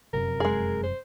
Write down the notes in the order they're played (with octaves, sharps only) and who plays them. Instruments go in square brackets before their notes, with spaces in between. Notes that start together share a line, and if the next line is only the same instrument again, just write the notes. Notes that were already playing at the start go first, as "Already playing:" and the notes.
[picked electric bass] F1 F#2 C3 [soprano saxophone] A#4
[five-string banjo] G#3 G#4
[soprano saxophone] C5